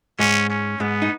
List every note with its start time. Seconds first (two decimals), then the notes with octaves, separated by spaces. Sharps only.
0.19 G#2 G#3 C#4
0.50 C#4
0.80 G#2 G#3 B3
1.02 D#4